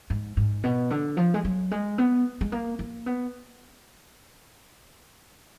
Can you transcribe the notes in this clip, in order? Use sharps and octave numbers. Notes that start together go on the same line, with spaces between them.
G#2
G#2
B2
D3
F3
G#3
F#3
G#3
B3
G#3
A#3
A#3
B3